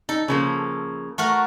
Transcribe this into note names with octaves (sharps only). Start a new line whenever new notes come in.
D#4 A4
C#3 F3 A#3
A3 F#4 A#4